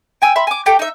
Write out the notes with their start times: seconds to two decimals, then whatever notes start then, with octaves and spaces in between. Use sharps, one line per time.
0.22 G5 G#5 E6
0.36 E5 B5 C6
0.47 G#5 D6
0.66 G4 A4 G5
0.79 D#4 E5